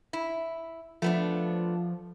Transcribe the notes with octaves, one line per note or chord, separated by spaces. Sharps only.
E4
F3 A3 B3 D4